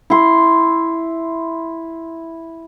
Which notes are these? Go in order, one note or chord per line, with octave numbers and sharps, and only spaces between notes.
E4 C6